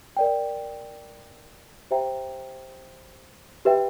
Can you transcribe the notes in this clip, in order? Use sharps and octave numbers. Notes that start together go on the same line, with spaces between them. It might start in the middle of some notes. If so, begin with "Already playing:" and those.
A#4 D5 G5
G4 C5 E5 G5 A#5
G4 B4 E5 G5